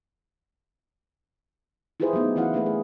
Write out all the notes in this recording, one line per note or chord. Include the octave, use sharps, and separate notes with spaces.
E4 F4 G4 G#4 B4 C5
F#3 A3 B3 D#4
E3 C#4 E4 F5 F#5
F#3 A3 A#3 D4 G#4 B4
G#4